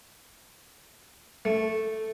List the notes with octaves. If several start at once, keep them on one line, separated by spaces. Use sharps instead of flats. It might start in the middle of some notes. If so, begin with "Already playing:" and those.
A3